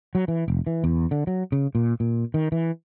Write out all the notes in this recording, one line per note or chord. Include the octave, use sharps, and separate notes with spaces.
F#3
E3
F1
E3
E2
D3
F#3
C#3
A#2
A#2
D#3
E3